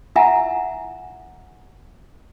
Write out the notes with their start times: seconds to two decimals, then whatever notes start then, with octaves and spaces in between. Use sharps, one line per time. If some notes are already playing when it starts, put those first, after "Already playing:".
0.16 E4 F4 E5 F#5 G#5 A#5